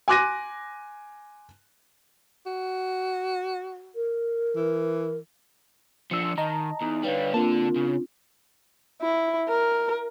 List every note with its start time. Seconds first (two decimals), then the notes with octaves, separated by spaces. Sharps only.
0.08 G#5 C6 D6 F#6 A#6 D#7
2.46 F#4
3.95 A#4
4.56 E3
6.11 F3 D4 E6 C#7
6.38 D#3 D#5 A5 A#5
6.82 E2 D#4
7.04 D3 G3 B4 C#5 F5
7.34 D3 A#3 C4 D4 F4 A5
7.76 C#3
9.02 E4
9.49 A#4